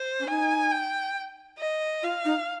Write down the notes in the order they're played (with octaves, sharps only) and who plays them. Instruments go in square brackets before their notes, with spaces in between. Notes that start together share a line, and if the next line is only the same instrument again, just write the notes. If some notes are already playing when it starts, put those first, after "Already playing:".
Already playing: [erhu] C5
[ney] C#4
[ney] D#4 [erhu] G#5
[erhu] G5
D#5
[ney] F4 [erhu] F5
[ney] D#4